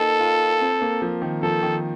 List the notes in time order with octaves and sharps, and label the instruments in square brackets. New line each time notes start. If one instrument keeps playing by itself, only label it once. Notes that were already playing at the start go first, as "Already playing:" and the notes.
Already playing: [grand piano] A#3 D#4 [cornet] A4
[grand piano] F4
C4
A#3
F3
D#3
[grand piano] F3 [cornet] A4
[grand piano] D#3